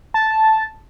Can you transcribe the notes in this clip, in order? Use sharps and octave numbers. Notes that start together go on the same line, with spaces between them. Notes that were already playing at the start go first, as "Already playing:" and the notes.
A5